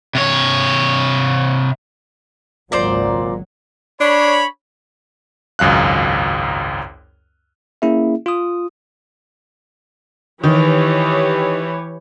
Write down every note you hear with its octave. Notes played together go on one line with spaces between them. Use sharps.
C3 C#5
G#1 C#2 A#2 F#3 C5 D5 A#5
D4 C#5 B5
G#1 C#2 F#2 F5 F#6
A#3 C#4 E4 G#4 E5
F4 D#6
D#3 E3 G4 C#5